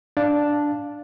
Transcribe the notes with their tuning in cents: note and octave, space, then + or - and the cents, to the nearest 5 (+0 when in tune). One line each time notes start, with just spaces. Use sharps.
D4 +0 F5 +0 A5 +0